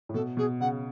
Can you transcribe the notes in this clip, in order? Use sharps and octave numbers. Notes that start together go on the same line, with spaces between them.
A2
B2 A4
B2 G#4
C#3 F#5